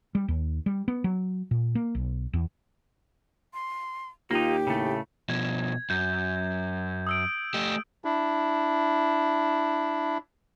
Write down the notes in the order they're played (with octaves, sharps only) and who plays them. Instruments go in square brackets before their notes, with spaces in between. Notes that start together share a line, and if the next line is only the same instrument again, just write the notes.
[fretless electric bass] G3
D#2
G3
B3
F#3
A#2
A#3
B1
E2
[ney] C6
[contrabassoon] D#2 [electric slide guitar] A#3 D#4 [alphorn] F4 [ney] G4
[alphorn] A2 [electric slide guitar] C#3 A3
[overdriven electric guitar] B2 F3 [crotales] G#6
[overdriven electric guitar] F#2 [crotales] G6
[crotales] D#6 E6 D7
[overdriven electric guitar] A3 G4
[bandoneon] D4 E4